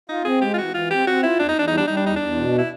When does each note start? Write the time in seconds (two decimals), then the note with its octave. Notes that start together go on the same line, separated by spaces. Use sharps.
0.09 D#4 F4
0.25 C4 G#4
0.41 G#3 G4
0.54 F4
0.58 E3 F#4
0.74 E3 F4
0.91 C4 G4
1.07 C4 F#4
1.23 E4 F4
1.39 E2 D4
1.49 D#4
1.56 E2 D4
1.68 G3 D#4
1.78 D4
1.87 G3 D#4
1.97 D4
2.04 E2 D#4
2.16 E2 D4
2.37 B2
2.58 E4